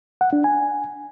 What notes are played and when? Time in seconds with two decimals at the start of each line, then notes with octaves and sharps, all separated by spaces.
0.21 F#5
0.33 D4
0.44 G#5